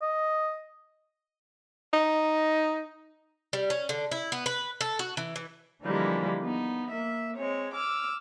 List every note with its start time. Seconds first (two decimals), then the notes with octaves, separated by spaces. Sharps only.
0.02 D#5
1.93 D#4
3.53 G3
3.70 C#4
3.89 D3
4.11 E4
4.32 B3
4.46 B4
4.81 A4
4.99 F#4
5.17 E3
5.36 E3
5.83 D3 E3 F3 G3 G#3 A#3
6.41 B3 D#4
6.90 A#3 E5
7.36 G#3 C4 C#5
7.73 D6 E6 F6